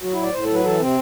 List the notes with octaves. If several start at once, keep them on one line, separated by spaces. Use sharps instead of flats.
F#3 F#4
A2 E4
D5
A2 C5
A4
F#3 B4
E3 A4
C3 C4